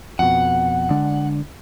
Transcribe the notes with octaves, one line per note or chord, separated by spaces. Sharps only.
F2 B2 F#5
D3 G#3 D4